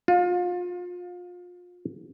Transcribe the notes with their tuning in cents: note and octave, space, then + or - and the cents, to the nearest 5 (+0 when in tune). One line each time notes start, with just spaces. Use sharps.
F4 +30